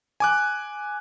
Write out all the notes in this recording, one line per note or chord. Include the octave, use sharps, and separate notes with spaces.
G#5 D6 F#6